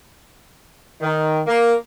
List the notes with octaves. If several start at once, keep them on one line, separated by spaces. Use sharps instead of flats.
D#3
A#3